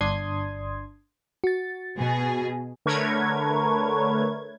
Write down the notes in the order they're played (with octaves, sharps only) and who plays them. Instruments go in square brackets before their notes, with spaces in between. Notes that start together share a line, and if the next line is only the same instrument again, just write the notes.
[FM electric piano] G1 D4 C6 D#6 G#6
F#4 A6
[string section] B2 G#4
[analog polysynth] D3 A3 A#4 B4 C#5 G#6